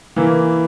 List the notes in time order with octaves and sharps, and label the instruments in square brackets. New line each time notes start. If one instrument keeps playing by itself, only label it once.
[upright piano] E3 A#3 E4